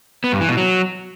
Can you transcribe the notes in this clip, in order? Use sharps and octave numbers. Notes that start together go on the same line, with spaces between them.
B3
G2
E3
B2
F#3